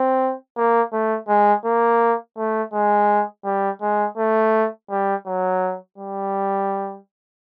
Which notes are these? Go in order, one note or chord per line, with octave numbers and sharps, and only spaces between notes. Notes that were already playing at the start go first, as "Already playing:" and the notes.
Already playing: C4
A#3
A3
G#3
A#3
A3
G#3
G3
G#3
A3
G3
F#3
G3